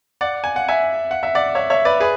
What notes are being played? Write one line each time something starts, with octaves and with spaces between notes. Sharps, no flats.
D5 F#5
G#5
F#5
E5 G#5
F#5
E5
D5 F#5
C#5 E5
C#5 E5
B4 D5
G#4 B4